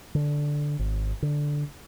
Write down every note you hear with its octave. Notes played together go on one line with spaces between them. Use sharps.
D3
G#1
D3